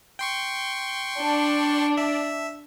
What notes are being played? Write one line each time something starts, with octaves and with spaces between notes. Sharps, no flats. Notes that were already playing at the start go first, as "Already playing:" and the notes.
G5 C6 C#6
D4
E5